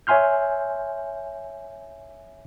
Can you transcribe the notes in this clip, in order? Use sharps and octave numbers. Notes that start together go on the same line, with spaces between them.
C#5 E5 G#5 C6 F6 G6